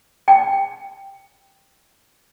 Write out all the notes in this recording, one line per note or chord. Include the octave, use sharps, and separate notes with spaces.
G5